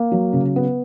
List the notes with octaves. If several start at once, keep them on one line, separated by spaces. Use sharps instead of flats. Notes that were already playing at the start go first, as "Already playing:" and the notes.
Already playing: A#3
F#3
C#3
B3